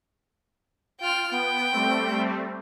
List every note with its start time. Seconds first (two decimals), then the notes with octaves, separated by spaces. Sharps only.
1.00 F4 G5 F6
1.31 B3 G5
1.71 G3 A3 C4